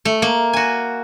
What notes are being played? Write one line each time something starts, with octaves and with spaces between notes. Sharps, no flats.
A3
A#3
F#4 G#5